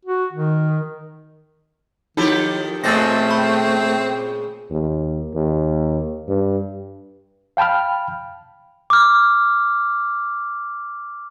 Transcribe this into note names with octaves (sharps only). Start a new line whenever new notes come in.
F#4
D#3
D#3 F3 D#4 E4 G4 A4
A#2 C#3 G#3 A3 C4 E6 A6 A#6
B5
D#2
D#2
G2
F5 G5 A5 B5 F6
D6 F6